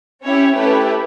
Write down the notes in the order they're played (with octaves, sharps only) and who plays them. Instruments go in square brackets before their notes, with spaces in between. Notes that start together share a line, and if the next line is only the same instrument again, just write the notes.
[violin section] C#4 E4 G4 C#5
A3 E4 G4 B4